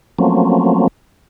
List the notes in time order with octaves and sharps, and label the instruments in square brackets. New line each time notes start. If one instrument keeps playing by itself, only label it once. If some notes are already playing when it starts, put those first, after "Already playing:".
[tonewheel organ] F3 F#3 A3 A#3 C4 C#4